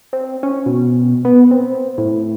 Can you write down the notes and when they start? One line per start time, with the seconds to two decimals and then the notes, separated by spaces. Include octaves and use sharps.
0.13 C4
0.43 C#4
0.66 B2
1.25 B3
1.51 C4
1.98 A2